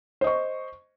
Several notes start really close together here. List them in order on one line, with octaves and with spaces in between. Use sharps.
C5 D#5 C#6